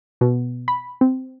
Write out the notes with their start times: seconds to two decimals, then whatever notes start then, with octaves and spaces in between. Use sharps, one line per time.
0.21 B2
0.68 B5
1.01 C4